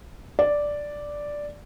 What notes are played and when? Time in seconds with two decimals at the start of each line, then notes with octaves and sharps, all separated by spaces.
0.39 D5